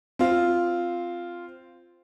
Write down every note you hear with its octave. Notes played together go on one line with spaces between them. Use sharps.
C4 F4